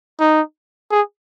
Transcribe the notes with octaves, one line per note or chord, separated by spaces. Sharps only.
D#4
G#4